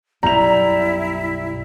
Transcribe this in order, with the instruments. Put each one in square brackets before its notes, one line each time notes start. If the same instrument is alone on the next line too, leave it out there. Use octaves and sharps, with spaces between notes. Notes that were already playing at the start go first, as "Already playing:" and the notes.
[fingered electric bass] B1 F#2 B2 [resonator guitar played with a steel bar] G3 [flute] E4 [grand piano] A#5 F7